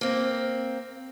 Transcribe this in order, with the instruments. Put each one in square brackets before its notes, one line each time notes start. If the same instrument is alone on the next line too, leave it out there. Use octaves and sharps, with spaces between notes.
[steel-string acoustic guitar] A#3 C4